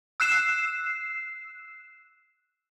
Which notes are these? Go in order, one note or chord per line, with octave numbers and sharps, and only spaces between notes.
E6 F#6 C7 E7